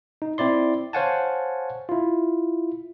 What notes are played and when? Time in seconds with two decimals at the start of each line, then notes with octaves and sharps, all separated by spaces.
0.22 D#4
0.38 C4 E4 D5 C6
0.93 C5 C#5 F5 F#5 G#5 A5
1.89 E4 F4